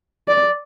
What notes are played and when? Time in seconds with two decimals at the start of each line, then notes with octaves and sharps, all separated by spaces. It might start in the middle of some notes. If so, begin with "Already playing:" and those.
0.28 D5